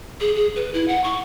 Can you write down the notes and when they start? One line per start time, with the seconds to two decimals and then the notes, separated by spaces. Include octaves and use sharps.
0.20 G#4
0.35 G#4
0.56 B4
0.74 E4
0.88 F#5
1.04 C#6